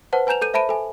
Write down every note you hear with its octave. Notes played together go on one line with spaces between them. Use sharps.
B4 C5 F#5 A5
B4 G#5 A#5 G6 E7 F7
A4 G6 D#7
C5 E5 A5 B5 D7 D#7
A4 G#5